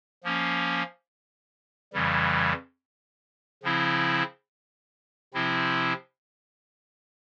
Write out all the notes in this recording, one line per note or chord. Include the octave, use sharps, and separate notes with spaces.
F3 A#3 C#4
F2 C#3 E3 G3
C#3 F3 C4 E4
C3 F3 C4 E4